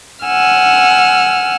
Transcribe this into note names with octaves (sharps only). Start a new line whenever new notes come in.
F#5 G#5 E6 F6